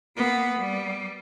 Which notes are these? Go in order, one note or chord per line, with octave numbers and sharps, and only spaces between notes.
A#3 B3
G3